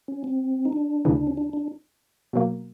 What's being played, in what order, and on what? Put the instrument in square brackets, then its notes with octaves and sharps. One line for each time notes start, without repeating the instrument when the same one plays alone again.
[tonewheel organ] C#4
C4
D#4
D4
[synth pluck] D2 C#3 E3
[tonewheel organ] C#4
D4
D4
[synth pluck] B2 F#3 A#3